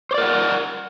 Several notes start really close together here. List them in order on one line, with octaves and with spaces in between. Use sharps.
C5 D5 A#4 F#5